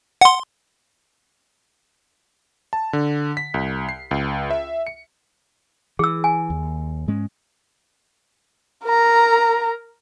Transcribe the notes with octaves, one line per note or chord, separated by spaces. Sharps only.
F#5 C6
A5
D3
B6
C2
C7
C#2
E5
C#7
E3 G#4 E6
G#5
D#2
G#2 G#3 C#4
A#4 A#5